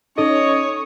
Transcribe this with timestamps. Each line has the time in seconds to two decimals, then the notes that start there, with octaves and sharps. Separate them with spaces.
0.18 C#4 D#4 A4 C#5 D#5